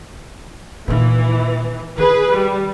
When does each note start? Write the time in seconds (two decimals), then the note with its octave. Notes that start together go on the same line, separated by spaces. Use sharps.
0.88 A#2 D#3 E3
1.98 D#3 G#4 B4
2.34 G3